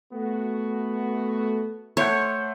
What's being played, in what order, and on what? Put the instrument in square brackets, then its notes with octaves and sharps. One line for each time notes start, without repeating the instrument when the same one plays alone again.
[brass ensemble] A3 B3 F#4
[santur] A3 C5 F#5 [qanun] C#5